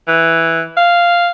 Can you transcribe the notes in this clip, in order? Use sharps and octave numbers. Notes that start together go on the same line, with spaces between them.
E3
F5